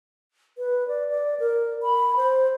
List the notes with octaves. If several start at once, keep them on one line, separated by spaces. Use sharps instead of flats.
B4
D5
D5
A#4
B5
C5